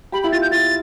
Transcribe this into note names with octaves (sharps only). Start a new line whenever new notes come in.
G4 B5
E4 B5
F4 A6
G6
E4 A6